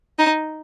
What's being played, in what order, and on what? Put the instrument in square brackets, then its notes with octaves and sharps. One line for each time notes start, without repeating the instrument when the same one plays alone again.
[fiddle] D#4